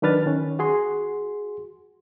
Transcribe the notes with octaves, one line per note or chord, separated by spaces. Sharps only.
D#3 F#3 D4 B4 F6 A6
D#3 C#4
F#4 G#4 C6